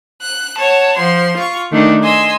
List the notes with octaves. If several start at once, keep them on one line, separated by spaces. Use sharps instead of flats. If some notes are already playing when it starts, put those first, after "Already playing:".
F#6
C#5 F#5 A5
F3 C6
F4 C#6
D#3 A3 D4 D#4
D#5 G#5 C6 E6